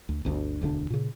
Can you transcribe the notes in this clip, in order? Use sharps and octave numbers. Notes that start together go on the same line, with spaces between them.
D2
G1 D2 D4
E1 D2 D3 D4
A#2 C#3